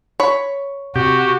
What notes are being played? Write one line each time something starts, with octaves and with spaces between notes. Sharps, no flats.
C#5 B5
C3 F#4 G4